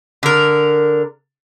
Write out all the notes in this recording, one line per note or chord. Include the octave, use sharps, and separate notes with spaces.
D3 A#4